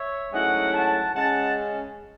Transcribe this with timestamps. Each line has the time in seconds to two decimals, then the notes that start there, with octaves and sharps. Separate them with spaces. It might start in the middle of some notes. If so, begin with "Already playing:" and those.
Already playing: C#5 E5
0.32 G#2 F#3 A3 C#4 E4 D#5 F#5
0.73 F#5 A5
1.14 C#3 G#3 C#4 F#5 A5